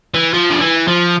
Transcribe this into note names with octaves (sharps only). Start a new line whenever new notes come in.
E3
F3
D3
E3
F3